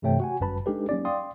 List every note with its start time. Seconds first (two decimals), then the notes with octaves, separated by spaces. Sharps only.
0.02 G2 C3 E3 A3 C#5 G5
0.20 F#4 F#5 G#5
0.40 G1 F#2 G3 B4 A5 B5
0.66 G#3 D4 D#4 G4 A4 B4
0.89 F#3 A#3 C#4 D#4 D5
1.05 D5 F5 G5 C6 D#6